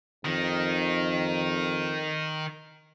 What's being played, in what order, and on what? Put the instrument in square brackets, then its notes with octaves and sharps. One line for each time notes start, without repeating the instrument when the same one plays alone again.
[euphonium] F2 [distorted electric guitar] D#3